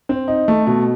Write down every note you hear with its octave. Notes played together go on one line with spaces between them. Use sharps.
C4
D#4
A3
B2